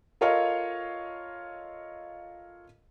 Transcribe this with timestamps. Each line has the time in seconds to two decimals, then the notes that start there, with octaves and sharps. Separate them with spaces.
0.21 F4 A4 A#4 C#5 D#5 F5